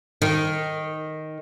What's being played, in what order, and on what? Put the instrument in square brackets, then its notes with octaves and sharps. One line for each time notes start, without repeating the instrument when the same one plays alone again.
[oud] D#3